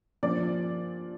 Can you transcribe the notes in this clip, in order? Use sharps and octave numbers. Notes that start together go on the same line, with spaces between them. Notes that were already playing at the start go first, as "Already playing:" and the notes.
A#2 F3 D4 D5